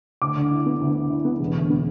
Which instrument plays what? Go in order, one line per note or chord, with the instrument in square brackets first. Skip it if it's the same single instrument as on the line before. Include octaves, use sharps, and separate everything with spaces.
[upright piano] D2 D6
D3
E4
B3
D2
D3
E4
B3
E1
D2
B3